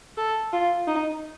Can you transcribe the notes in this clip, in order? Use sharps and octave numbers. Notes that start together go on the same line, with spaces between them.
A4
F4
D#4